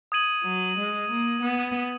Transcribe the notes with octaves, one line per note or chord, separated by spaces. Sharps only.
D#6 G#6 D#7 F#7
F#3
G#3
A#3
B3